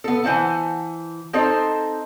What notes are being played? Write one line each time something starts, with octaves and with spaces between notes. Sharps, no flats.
B3 A4
E3 C5 F#5 A5
C4 D#4 A4 C5 D#5